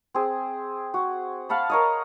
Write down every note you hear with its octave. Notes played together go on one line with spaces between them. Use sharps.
C4 G#4
F#4
F5 F#5 A5 B5
A#4 C#5 D#5